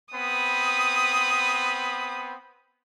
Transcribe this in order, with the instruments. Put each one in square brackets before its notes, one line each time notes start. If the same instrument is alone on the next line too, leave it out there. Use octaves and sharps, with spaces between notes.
[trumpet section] B3 C4 B5 [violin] D#6